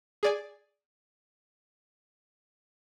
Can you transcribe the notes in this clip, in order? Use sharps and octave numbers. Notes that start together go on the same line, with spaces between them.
G#4 D5 G#5